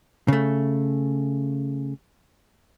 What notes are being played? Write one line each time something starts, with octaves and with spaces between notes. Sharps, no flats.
C#3 A3